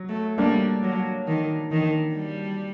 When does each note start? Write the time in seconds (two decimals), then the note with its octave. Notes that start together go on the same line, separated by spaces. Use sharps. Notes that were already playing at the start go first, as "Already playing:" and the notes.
Already playing: F#3
0.09 A3
0.38 G3 A#3 D4
0.83 F#3
1.27 D#3
1.71 D#3
2.15 G3